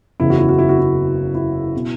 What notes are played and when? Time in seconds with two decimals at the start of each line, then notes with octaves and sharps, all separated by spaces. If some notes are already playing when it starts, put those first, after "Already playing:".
0.20 F#1 E2 C#3 E4
0.30 F#4
0.39 E4
0.49 F#4
0.59 E4
0.69 F#4
0.78 E4
1.35 E4
1.76 B2